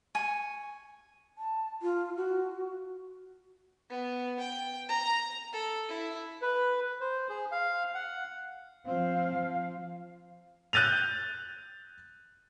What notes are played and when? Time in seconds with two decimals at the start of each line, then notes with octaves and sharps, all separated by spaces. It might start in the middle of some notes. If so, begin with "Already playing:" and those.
0.15 G#5 C#6
1.38 A5
1.82 F4
2.17 F#4
3.90 B3
4.40 G5
4.89 A#5
5.53 A4
5.89 E4
6.42 B4
7.00 C5
7.29 G#4
7.52 F5
7.95 F#5
8.86 F3 C4 F5
9.31 F3
10.73 F#6 G6 A6 D#7 F7